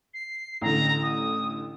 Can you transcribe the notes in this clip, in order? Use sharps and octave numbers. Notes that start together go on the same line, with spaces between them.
C7
A1 D3 A#5
D#6